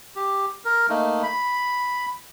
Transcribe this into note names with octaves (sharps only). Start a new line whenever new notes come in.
G4
A#4
A3 A#3 D#4
B5